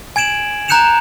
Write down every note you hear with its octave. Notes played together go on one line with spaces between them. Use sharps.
G#5 G#6 D7 E7 F#7
A#5 F#6 G6 C#7 E7 F7